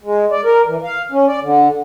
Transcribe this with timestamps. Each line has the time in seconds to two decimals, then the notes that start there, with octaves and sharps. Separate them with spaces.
0.03 G#3
0.31 D5
0.44 A#4
0.66 E3
0.83 F5
1.12 C#4
1.28 D5
1.43 D3